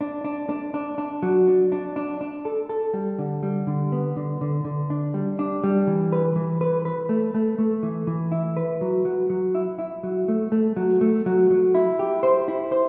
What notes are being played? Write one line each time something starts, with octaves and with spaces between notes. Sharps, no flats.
D4
D4
D4
D4
D4
F#3
D4
D4
D4
D4
A4
A4
G3
D3
G3
D3
B3
D3
D3
D3
D4
G3
D4
G3
E3
B4
E3
B4
B4
A3
A3
A3
E3
E3
E4
B4
F#3
F#3
F#3
E4
E4
F#3
A3
A3
F#3
A3
F#3
F#3
E4
G4
C5
E4
C5